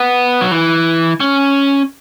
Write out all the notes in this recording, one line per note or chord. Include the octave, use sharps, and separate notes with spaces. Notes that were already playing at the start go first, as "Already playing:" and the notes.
Already playing: B3
F#3
E3
C#4